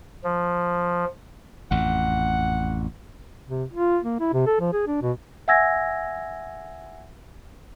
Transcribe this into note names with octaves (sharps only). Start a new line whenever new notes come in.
F3
A1 F2 F#5
C3
F4
A#3
E4
C3
A4
F3
G#4
D4
B2
E5 F#5 G#5 E6 G#6 A#6